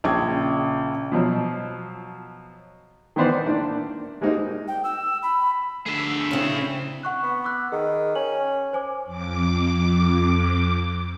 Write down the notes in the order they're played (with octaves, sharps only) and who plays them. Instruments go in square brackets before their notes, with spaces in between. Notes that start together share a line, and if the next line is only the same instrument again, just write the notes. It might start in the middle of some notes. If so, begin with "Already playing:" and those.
[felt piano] A#1 C#3 G5 G#6
[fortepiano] B2 F3 F#3
D#3 E3 B3 C5 D5
D#3 A#3 D4 E4
G3 G#3 A#3 C4 D#4 F#4
[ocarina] G5
E6
B5
[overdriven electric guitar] D3 A3 [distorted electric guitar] G#4 E5
[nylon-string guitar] C#3 C#4 [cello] C4 E4
[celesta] F#5 C#6 F#6
[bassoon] B3
[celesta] D6 E6 F#6
[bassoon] D#3 [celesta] G#4
[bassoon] C#4 [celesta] F#7
[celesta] C5 G#5 D6
[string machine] F2 D6